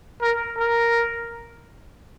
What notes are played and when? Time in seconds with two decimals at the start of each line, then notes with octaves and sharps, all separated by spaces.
0.22 A#4
0.58 A#4